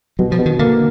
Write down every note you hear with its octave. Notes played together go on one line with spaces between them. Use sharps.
B2 F#3
F3
B2
D#3
D3 A#3